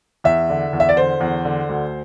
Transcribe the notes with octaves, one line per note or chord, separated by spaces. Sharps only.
E2 E5
D3
E2
E5
D5
D3 C5
E2
D3
D2